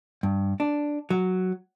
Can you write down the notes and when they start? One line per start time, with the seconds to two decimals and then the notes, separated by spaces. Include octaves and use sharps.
0.23 G2
0.60 D4
1.10 F#3